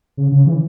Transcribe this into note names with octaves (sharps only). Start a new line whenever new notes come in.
C#3
C#3
E3